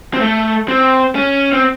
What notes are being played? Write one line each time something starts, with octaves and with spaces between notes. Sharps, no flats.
C4
A3
C4
C#4
C4